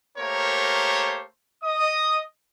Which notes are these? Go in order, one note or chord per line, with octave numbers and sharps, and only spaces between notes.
A3 A#3 G4 A#4 C5 C#5
D#5 D#6